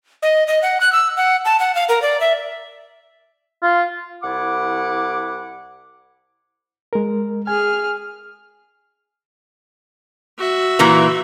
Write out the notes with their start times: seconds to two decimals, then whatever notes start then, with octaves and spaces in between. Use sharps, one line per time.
0.23 D#5
0.47 D#5
0.62 F#5
0.81 F#6
0.93 E6
1.17 F#5
1.45 A5
1.60 F#5
1.75 F5
1.89 A#4
2.02 D5
2.21 E5
3.63 F4
4.22 C2 E4 F#5 D6
6.93 G#3 A#4
7.47 G#4 G#5 F6
10.38 F#4 E5
10.79 A#2 E3 A#3